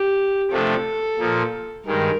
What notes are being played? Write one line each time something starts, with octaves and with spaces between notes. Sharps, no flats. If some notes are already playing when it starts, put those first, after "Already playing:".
Already playing: G4
C3 F3 A3 D4 A4
A#2 F3 A#3
G2 D#3 G#3 A#4